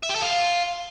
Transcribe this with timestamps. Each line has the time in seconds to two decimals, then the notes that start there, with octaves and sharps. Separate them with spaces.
0.03 E5
0.09 G4
0.16 A4
0.22 F4